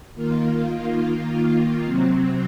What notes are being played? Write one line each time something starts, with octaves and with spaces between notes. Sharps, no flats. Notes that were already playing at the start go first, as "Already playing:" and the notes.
D#3 A#3 F4
C3 F#3 C4